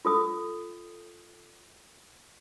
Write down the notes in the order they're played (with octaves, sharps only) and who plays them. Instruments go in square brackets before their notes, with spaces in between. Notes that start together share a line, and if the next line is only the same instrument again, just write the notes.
[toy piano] F4 A4 D#6